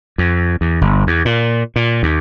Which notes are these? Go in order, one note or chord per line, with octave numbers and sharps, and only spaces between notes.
F2
E2
G1
E2
A#2
A#2
D#2